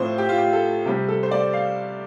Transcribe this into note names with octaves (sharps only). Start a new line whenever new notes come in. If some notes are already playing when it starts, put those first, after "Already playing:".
Already playing: A2 F3 C4 C5
G4
F4
G4
A4
C3 G3 C4 G4
A4
C5
D5
F5